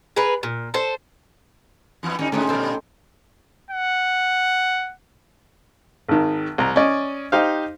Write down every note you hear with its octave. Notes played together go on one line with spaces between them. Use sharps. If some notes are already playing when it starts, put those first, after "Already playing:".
G#4 A#4 B4
A#2
A4 C5
E2 E3 B3
D3 G3 C#4 D#4
G#2 D3 G#3 A3 C#4 D#4
A#2 D3 G3 A4 C5
F#5
G#1 D#3
C2 A#5
C#4 D5 D#5
D#4 G4 C5 F5